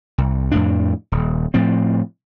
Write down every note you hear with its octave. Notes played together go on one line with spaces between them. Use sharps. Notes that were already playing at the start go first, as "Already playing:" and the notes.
C2
F2 A2 D4
D#1
A2 F3 C4